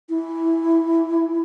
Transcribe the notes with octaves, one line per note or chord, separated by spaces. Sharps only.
E4